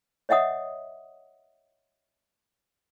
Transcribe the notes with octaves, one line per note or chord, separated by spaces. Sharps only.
C#5 D#5 E5 F#5 D#6